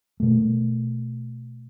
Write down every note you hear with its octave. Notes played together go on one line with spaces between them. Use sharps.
B2 A3